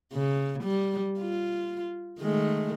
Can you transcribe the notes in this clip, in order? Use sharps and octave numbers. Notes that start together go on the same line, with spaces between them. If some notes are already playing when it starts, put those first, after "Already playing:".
C#3
G3
F4
D#3 G#3 A3